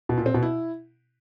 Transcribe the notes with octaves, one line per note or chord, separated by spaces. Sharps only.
B2
A#2
C4
B2
E4